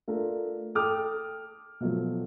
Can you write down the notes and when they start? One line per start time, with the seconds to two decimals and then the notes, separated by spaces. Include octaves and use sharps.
0.08 A3 D4 F4 A4 A#4
0.75 A4 G5 D6 D#6 F6
1.81 B2 F3 F#3 A3